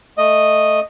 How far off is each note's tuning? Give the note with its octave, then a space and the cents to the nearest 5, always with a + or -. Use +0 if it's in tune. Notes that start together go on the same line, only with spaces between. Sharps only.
A3 +0 D#5 -5